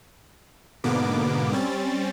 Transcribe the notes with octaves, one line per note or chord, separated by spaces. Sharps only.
G#2 B2 D3 A#3 B3 D6
G3 C4 C#4 A6